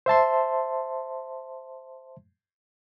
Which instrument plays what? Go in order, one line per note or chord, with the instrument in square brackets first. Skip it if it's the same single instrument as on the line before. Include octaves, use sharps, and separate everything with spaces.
[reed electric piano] C5 E5 A5 C6